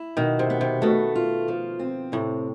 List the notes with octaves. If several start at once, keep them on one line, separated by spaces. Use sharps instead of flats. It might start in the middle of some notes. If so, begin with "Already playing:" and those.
Already playing: E4
B2 D#3
C3
B3
C3
B2 A3
F4
F3
C4
A2 C3